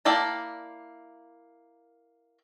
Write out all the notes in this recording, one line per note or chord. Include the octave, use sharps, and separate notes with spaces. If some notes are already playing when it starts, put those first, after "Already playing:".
A#3 E4 D5 G5 A5